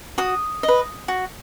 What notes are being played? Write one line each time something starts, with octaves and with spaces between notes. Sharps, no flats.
F#4 D#6
D#5
B4
F#4